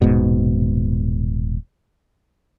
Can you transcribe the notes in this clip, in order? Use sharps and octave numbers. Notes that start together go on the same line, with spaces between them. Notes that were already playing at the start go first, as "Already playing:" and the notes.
D#1 G#2 B2